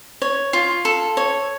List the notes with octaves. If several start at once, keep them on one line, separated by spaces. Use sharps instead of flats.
C#5
F4
A4
C#5